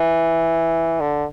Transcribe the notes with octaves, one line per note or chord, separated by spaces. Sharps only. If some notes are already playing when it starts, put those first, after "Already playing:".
Already playing: E3
D3